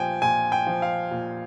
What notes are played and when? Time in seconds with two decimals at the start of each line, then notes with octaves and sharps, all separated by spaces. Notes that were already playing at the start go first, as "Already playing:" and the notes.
Already playing: A#2 F3 G5 G#5
0.22 A#2 G#5
0.52 G5
0.66 F3
0.82 F5
1.11 A#2